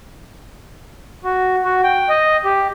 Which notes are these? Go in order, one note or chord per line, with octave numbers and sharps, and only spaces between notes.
F#4
F#4
G5
D#5
G4